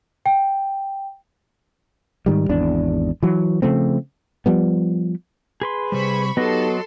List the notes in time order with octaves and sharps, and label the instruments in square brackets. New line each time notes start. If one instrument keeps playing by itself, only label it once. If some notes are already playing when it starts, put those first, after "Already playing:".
[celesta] G5
[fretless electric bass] G#2 D#3 G3
G#1 E2 D4
E3 F#3
C#3 F3 A3 C4
F3 G3 B3
[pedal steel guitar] G#4 B4 C6
[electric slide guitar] C3 G3 [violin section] C5 B5 C#6
[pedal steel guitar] F#3 D#5 [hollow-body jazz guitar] B3 [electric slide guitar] D#4 G4 [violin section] A4 C6